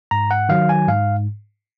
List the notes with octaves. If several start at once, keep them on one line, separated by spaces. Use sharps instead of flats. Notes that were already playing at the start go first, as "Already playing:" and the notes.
G#2 A#5
F#5
D#3 F#3 F5
G#5
G#2 F5